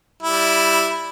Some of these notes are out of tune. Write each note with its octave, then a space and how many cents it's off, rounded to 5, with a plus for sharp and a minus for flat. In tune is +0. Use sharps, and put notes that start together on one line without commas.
G3 -5 E4 +0